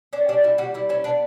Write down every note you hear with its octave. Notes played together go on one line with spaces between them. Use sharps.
C#4 D4
G3 D4
G3 E4
G3 F#4
G3 E4
C#4 E4
B3 D4